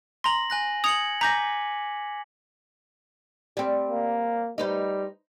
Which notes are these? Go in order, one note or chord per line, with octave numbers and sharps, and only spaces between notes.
A#5 C6 A#6 F#7
G#5 F#6 A#6
D#6 G#6 C#7 F7 F#7
G#5 A#5 D6 G6 A#6 B6
G3 C4
A#3
G3 D#4 B4 C5